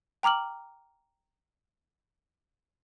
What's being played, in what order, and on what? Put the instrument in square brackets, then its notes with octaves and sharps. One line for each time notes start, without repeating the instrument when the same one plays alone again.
[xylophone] G5 A#5 D6 F6 F#7